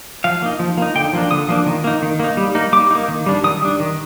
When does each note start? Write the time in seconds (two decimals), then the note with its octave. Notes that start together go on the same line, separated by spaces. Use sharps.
0.24 F3 F5
0.42 A#3 D#4
0.60 F3
0.78 A#3 D#4
0.95 D3 G5
1.13 F3 A#3 D4
1.31 D3 D#6
1.48 F3 A#3 D4
1.66 D#3
1.84 A#3 D#4
2.02 D#3
2.20 A#3 D#4
2.37 G3
2.55 A#3 D#4
2.73 G3 D6
2.91 A#3 D#4
3.08 D#3
3.26 G3 D4
3.44 D#3 D#6
3.62 G3 D4
3.80 D#3